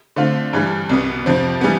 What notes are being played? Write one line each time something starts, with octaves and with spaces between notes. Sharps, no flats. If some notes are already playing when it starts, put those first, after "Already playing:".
D3 A3 C4 F4
G2 E3 G3
C2 B2 B3
F2 C3 F3 C4
E3 G3 B3